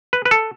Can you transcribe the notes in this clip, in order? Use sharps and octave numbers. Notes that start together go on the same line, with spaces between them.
B4
B4
A4